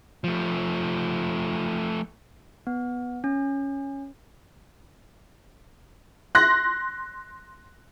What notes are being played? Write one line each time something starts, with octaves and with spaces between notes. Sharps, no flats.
F3 A3
B3
C#4
C6 F#6 A#6